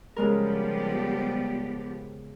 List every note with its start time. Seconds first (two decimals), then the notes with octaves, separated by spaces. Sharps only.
0.16 C#3 F3 G3 G#3 B3 G4 A#4